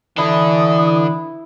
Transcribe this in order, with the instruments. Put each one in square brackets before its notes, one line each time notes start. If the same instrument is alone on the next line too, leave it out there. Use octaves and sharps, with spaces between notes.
[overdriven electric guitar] D3 D4 [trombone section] E3 [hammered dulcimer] E4 [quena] D#6